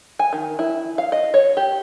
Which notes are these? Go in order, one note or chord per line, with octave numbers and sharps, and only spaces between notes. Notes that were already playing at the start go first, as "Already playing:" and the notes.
G#5
D#3
E4
F5
D#5
C#5
G4